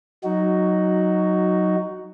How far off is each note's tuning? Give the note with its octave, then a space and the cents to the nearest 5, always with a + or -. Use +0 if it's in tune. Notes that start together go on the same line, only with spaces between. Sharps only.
F#3 +0 D#4 +0 F#4 +10